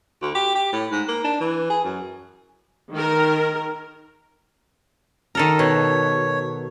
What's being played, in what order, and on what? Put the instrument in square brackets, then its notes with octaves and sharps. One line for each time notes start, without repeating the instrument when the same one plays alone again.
[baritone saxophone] D2
G4
G4
A2
G#2
A#3
D4
E3
G#4
F#2
[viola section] D#3 A#4
[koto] D#3 A4 A#4
[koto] B2 [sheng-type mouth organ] C#5